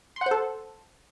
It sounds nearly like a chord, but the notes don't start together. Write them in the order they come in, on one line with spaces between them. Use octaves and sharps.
C6 F#5 C5 A4